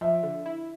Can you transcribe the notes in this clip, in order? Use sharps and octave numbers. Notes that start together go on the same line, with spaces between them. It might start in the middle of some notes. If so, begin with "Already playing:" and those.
F3 E5
D3
E4